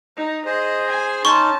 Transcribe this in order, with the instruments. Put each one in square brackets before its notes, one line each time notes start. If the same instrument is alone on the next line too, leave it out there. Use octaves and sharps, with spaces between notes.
[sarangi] D#4
[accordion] G#4 C5 [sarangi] D#5
[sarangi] G#5
[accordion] C#4 D#4 [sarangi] A5 [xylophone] C6 C#6